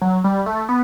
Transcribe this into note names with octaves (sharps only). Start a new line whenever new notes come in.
F#3
G3
A3
B3